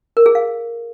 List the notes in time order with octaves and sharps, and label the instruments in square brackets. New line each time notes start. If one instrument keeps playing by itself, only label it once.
[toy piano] A#4
G#4
F5